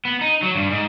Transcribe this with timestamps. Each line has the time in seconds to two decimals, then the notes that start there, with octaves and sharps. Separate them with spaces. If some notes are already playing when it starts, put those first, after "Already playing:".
0.05 B3
0.21 D#4
0.43 F#3
0.55 G2
0.70 G#2